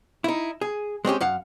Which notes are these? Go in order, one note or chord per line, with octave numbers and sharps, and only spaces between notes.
D#4 E4
G#4
G#3 C4 C#4 G4
F#2 F5 F#5